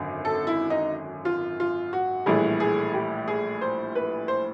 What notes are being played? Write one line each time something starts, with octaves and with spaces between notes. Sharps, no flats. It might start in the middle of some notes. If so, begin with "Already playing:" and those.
Already playing: G#1 F#2 D3
A4
E4
D#4
F4
F4
F#4
A#1 A2 E3 G3 G#4
G#4
G4
G#4
C5
B4
C5